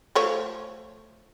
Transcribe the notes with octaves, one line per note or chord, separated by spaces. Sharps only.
F3 A3 C#5